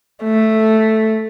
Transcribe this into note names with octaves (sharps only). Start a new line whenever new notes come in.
A3